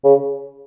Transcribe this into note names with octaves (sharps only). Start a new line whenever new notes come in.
C#3